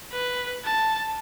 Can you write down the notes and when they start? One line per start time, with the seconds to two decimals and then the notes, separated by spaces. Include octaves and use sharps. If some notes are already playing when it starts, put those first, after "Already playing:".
0.12 B4
0.65 A5